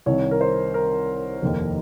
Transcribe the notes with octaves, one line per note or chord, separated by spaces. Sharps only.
C2 C3 D#3 C#5
A#4
C5
A#4
F1 D#2 D#3